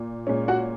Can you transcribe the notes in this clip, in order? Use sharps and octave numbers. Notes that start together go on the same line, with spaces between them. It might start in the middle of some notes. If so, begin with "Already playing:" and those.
Already playing: A#2
A#2 G#3 C#4
F#4 F#5